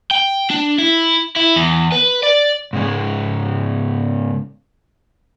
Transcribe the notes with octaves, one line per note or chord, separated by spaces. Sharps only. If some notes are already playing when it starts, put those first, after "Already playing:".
G5
D4
E4
E4
E2
B4
D5
G#2 C#3 G#3